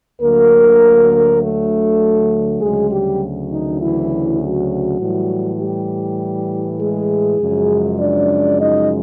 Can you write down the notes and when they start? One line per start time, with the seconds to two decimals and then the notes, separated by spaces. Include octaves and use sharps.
0.21 D2 D3 F#3 A#3 A#4
1.42 A3 A4
2.61 D2 C#3 F#3 G#3 G#4
2.91 G3 G4
3.51 D#3 D#4
3.81 E3 E4
4.40 F#3 F#4
5.00 A2 E3 G3
5.60 G3 G4
6.80 G#3 G#4
7.40 F#2 C#3 F3 G#3
8.00 D4 D5
8.60 D#4 D#5